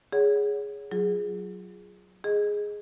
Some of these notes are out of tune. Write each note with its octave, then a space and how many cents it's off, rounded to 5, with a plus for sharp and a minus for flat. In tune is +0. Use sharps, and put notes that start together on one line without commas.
G#4 +0 C#5 +25 F#5 +0
F#3 +0 F4 +0 G#4 -5
G#4 +0 D#5 +0